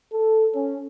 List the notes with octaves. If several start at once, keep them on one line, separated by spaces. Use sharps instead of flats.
A4
C#4